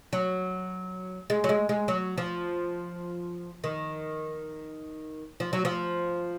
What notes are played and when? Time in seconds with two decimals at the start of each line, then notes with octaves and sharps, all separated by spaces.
0.13 F#3
1.30 G#3
1.44 F#3
1.49 G#3
1.69 G#3
1.88 F#3
2.18 F3
3.64 D#3
5.40 F3
5.53 F#3
5.65 F3